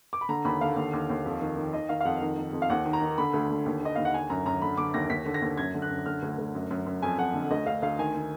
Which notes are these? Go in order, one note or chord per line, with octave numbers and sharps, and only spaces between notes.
D6
B5
D3 A#5
D#2 B5
D3 F5
D#2
D#2
D#2
F2
D#3
D#3
D#3 D#5
D#3 F5
F5
F2 F#5
D#3
D#3
F2
F5
D#2 F#5
D#3
A#5
D#3
D3 B5
D2
D3
D#2
D#3 D#5
D#2 F5
F#5
D3 G#5
F#2 A#5
F#2 A#5
D3 B5
D3 D6
D#2 A#6
D#2 B6
D3
A#6
D#2
F#2 G#6
D3
F#6
F#2
D3 F6
D2
D2
F#2
F#2
F#2
F2 G#5
F2 F#5
D3
D2 D#5
D2 F5
D2 F5
D#3 G#5
D#3